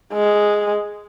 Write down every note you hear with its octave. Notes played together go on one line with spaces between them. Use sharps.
G#3